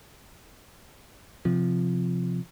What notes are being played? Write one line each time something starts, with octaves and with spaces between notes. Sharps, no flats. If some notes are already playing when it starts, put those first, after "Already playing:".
C3 F3